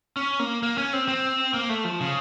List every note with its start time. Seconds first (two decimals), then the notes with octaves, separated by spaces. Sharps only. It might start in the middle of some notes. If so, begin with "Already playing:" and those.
0.16 C#4
0.39 A#3
0.63 A#3
0.78 C#4
0.93 C4
1.08 C4
1.54 A#3
1.69 A3
1.84 F3
2.01 C#3